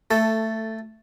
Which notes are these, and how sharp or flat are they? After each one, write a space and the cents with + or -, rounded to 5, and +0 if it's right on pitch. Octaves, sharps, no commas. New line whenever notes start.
A3 +15 A4 +0